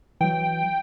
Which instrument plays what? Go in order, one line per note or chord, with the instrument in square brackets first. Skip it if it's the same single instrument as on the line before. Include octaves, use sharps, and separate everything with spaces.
[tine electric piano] E3 F#3 [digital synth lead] G5